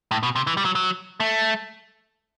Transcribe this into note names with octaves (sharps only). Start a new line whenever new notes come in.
A2
B2
C3
E3
G3
F#3
F#3
A3